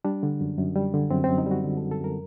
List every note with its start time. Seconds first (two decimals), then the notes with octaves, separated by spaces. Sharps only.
0.05 G3 D4
0.23 D3
0.41 F#2
0.58 F#2
0.76 G3
0.94 D3
1.11 F#2 C4
1.24 C4
1.29 F#2
1.38 D#4
1.46 G3
1.51 F#4
1.64 D3
1.77 A4
1.83 F#2
1.91 A4
2.00 F#2 A#4